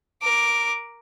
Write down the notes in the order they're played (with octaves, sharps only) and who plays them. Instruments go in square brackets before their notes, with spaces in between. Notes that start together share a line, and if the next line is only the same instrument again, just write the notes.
[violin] A#4 D6